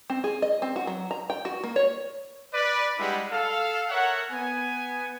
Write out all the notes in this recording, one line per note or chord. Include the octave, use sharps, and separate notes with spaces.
C4
G#4
D#5
C4
F#4
F#3
A#5
G5
F#4
A#3
C#5
B4 D5
G3 G#3 D4 E4 F#5 B5
A4 F5
A#4 C#5 E5 F#5
B3 G#5